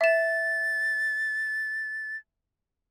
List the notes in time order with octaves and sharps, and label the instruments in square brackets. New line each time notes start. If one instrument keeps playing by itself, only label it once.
[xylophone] E5 E7 [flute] A6